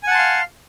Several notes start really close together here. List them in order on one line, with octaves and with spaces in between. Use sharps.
G#5 F#5 A5 C6 F5